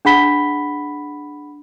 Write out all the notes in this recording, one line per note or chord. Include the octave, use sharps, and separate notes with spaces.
D4 G#4 F#5 B5 B6 G7